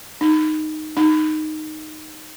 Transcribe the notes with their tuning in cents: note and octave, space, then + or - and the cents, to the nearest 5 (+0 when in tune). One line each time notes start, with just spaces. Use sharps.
D#4 -5
D#4 -5